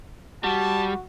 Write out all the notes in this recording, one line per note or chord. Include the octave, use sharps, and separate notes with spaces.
G3 F#4 A5